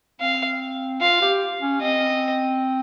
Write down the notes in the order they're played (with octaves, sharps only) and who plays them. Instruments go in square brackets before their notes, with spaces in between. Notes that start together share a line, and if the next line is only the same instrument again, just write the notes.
[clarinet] C4 [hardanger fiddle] F5
[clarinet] F4 [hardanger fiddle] F5
[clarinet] G4
C#4
[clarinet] C4 [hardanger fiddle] D#5